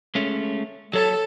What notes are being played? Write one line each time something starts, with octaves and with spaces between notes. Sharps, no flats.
G#3 A3 C#4
F#3 A4 C#5 A5